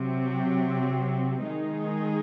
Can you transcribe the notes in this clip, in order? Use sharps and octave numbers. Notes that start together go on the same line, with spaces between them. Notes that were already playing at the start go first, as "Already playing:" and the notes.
Already playing: C3 F#3 C4
D#3 G#3 D#4 G#4